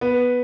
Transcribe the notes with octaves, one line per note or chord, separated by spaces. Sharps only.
B3